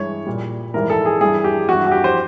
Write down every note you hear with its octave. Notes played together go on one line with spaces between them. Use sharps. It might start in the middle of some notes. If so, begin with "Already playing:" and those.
Already playing: G2 E3 G#3 C#5
A#2 G3
G#2 E3 G3 A#4
A4
G#4
G2 E3 G3 G#4
G4
G2 E3 G3 F#4
F#4
G4
C5